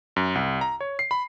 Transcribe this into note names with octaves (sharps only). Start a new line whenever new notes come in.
F#2
C2
A#5
C#5
C7
B5